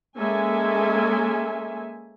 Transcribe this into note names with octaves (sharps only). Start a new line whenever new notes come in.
G#3 A#3 C#4 A4 E5 G#5